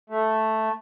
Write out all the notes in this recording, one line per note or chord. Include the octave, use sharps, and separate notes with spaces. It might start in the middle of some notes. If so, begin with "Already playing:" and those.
A3